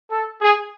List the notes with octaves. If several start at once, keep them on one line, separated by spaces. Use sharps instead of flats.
A4
G#4